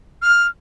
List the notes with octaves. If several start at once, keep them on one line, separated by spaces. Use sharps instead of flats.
F6